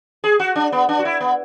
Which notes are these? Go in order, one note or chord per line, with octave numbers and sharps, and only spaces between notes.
G#4
F#4
D4
B3
D4
F#4
E4
B3